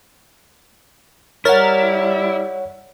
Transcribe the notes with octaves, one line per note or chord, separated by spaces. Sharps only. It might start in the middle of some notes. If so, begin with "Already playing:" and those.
G3 E4 A#4 C#5 F#5 F6 A6